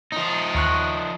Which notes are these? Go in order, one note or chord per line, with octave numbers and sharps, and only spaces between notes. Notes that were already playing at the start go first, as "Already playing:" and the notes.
F3 D#4
D#2 C#6 F#6